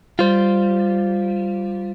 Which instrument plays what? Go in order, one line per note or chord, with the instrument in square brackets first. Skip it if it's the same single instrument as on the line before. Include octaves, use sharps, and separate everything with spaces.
[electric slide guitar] G3 [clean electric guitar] F4 C5